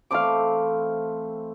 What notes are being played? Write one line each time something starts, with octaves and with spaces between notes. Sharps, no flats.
E3 A3 C4 F5 D6